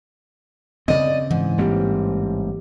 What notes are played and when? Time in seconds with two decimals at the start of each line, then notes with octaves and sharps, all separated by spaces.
0.88 C#3 C4 D5 D#5
1.31 G#2 E3
1.58 A1 G3 A#3 C4 G4